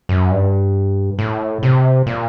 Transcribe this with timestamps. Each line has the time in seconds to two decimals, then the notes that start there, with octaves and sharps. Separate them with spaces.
0.09 F#2
0.31 G2
1.19 A2
1.63 C3
2.07 A#2